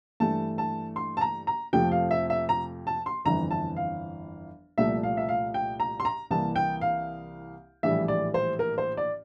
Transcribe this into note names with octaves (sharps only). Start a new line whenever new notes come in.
G2 E3 A3 A5
A5
C6
A5
A#5
A#5
F2 C3 F3 A3 G5
F5
E5
E5
A#5
A5
C6
G1 F2 E3 A#5
A5
F5
C2 A#2 F3 A3 E5
F5
E5
F5
G5
A#5
C6
A#5
C2 C3 E3 A#3 A5
G5
F5
A#1 A2 E3 G3 E5
D5
C5
A#4
C5
D5